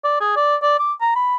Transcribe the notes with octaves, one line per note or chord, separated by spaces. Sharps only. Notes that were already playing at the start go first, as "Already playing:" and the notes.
D5
G#4
D5
D5
D6
A#5
B5